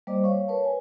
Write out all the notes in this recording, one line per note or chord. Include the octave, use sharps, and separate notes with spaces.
G3 A#3 C5 D5 D#5 D6
C#5 F5 C#6
A#4 B4 C#5 A5
G#5